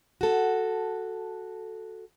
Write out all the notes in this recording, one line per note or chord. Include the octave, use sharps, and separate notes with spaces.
F#4 A4